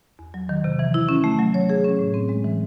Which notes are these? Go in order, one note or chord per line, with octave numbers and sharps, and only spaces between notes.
E2
F#3
D#3
C3
E3
E4
C#4
A3
F#3
C#5
G#4
C#4
A2
C4
G#3
E3